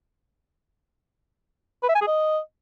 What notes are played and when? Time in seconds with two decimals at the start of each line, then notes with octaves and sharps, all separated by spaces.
1.83 B4
1.89 E5
1.95 G#5
2.01 G#4
2.07 D#5